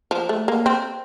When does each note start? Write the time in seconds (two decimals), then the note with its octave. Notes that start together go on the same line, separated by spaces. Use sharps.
0.11 F3
0.29 A3
0.48 A#3
0.66 C4